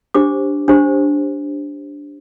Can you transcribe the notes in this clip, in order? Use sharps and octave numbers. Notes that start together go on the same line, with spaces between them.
D4 G4 C5 D6
D4 G4 C5